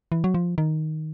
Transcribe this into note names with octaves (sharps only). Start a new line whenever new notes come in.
E3
F#3
F3
D#3